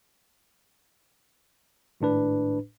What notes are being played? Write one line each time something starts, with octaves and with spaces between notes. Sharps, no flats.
G#1 A2 D4 B4